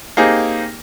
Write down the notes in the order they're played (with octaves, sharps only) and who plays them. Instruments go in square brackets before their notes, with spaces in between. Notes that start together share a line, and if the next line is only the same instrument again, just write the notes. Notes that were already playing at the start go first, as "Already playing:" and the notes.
[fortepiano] A#3 C4 D#4 G4 G#4